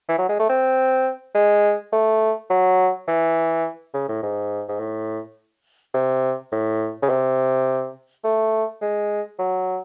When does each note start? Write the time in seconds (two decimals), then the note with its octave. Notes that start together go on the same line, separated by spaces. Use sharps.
0.08 E3
0.18 F#3
0.29 G#3
0.39 A3
0.49 C4
1.35 G#3
1.93 A3
2.50 F#3
3.08 E3
3.94 C#3
4.08 A2
4.23 G#2
4.68 G#2
4.80 A2
5.94 C3
6.52 A2
7.02 C#3
7.09 C3
8.24 A3
8.81 G#3
9.39 F#3